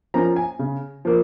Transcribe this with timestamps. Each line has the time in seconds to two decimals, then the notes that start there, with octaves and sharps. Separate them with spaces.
0.14 F3 A#3 C#4 A#5
0.36 G#5
0.59 C#3
1.05 F3 A#3